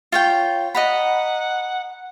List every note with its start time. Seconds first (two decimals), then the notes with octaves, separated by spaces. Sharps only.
0.12 F4 C#5 G5
0.75 D#5 F#5 A#5 B5